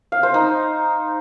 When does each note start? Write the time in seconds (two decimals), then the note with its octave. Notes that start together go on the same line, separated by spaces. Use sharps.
0.12 F5
0.23 C5
0.34 D#4